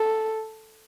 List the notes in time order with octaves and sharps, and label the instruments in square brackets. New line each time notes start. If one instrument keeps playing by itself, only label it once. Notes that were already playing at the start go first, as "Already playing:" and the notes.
Already playing: [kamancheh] A4